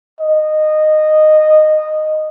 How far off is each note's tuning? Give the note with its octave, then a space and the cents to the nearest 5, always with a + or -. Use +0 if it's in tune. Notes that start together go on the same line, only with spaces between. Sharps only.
D#5 -15